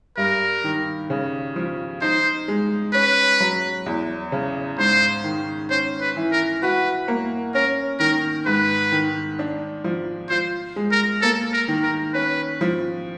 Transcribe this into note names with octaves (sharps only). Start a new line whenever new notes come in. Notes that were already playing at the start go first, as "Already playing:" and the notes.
G2 A#4
D#3
C#3
F3
D#4 C5
G#3
C#4 B4
F#3
E2
C#3
G#2 C5
D#3
C#4 C5
B4
E3
A#4
F#4 B4
A#3
C#4 A#4
D#3 A#4
G#2 B4
D#3
D4
F3
F4 C5
G#3
A#4
A#3 A4
A#4
D#3
A#4
C#4 B4
F3